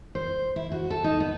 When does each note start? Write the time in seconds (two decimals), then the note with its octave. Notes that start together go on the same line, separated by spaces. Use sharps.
0.15 C5
0.56 E4
0.72 F#4
0.90 A4
1.04 D#4
1.20 B3